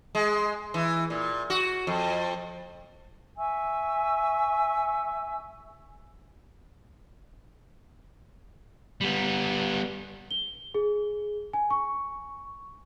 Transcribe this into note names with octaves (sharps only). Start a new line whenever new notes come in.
G#3
E3
A#2
F#4
F2
E5 G#5 C#6 E6
G3 B3
G7
G#4
G#5
C#6